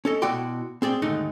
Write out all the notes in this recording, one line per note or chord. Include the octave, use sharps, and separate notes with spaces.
C#4 A4 D#5
B2 E4 F#4 D5 G5 C6
C4 G#4 D5 G5
D#2 G#2 D3 A3 D#4